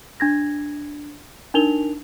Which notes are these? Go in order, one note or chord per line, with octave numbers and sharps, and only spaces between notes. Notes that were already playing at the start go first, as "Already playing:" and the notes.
D4 G#6 A#6
D4 D#4 A#4 F7 G7